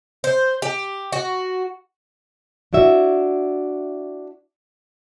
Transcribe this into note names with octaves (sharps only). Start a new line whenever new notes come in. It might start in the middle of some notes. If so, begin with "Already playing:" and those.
C5
G4
F#4
D4 E4 F#4 E5